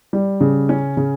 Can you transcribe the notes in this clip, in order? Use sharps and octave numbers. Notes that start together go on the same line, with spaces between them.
G3
C#3
C#4
C#3